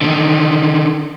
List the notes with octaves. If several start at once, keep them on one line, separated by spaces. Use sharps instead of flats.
D3 D#3